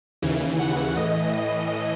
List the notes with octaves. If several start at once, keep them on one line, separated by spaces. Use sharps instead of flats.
D#2 C#3 E3
F#5
A2 E3 D#5
D#5